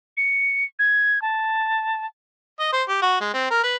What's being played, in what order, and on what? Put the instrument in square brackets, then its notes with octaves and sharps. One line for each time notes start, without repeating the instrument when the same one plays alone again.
[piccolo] C#7
G#6
A5
[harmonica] D#5
C5
G4
F#4
G#3
C4
A#4
B4